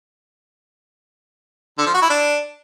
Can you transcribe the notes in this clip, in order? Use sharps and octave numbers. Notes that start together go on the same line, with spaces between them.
D3
F3
F#4
E4
D4